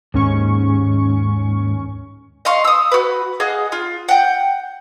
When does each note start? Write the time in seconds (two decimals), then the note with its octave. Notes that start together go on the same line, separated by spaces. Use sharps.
0.14 D#2 G#2 C#4 C#6
2.45 D#5 F5 C6 C#6
2.64 D#6 E6
2.92 F#4 B4
3.40 G#4 D#5 F5 F#5
3.72 F4
4.09 F#5 G5